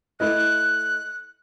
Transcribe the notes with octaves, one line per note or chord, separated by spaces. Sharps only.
A3 E4 D#5 F#6